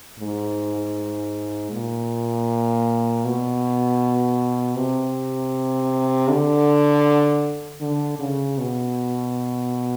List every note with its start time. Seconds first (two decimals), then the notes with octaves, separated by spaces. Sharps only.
0.19 G#2
1.72 A#2
3.24 B2
4.77 C3
6.30 D3
7.81 D3
8.19 C#3
8.58 B2